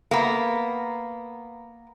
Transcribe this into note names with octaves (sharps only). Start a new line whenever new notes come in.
A#3 B3